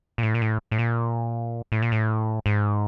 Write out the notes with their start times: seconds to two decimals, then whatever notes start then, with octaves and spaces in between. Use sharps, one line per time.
0.18 A#2
0.23 A2
0.34 A#2
0.42 A2
0.71 A2
0.79 A#2
1.72 A2
1.82 A#2
1.92 A2
2.46 G#2